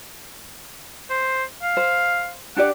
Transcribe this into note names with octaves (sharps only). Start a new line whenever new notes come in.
C5
F5
C5
D4 G4 D5 F#5